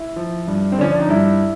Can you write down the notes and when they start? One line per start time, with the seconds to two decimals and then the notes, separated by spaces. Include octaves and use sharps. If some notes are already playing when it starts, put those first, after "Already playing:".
Already playing: E4
0.16 F3
0.48 G2
0.72 C4
0.78 D3 F3 C#4
0.92 D4
1.00 D#4
1.09 G2 E4